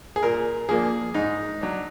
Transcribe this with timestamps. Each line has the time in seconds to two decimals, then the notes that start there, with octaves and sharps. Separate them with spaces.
0.16 G#4
0.23 A#2 A#4
0.69 F3 A#3 D4 G#4
1.14 G#2 D#4
1.61 F#3 D4